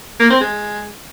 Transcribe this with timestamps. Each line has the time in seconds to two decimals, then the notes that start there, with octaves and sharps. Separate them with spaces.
0.20 A#3
0.30 C4
0.41 G#3